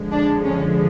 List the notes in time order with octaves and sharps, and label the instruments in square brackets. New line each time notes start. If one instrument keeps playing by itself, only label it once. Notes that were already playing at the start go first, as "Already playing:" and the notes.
Already playing: [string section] F2 D3 F3 G#3
D4
C#4